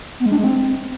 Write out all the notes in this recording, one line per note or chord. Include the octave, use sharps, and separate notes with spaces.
B3
G#3
D4
G#3
C4